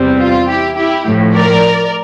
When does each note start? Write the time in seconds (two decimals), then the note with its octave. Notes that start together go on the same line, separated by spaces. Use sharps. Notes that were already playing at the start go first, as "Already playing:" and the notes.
Already playing: E2 C3 G3 C4
0.18 F4
0.48 E4 G4
0.76 E4 G4
1.06 A2 F3 A3
1.34 A#4 D5